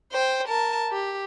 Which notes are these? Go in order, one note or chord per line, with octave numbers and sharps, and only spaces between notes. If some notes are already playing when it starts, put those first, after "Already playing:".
C5 G5
A#4 A5
G4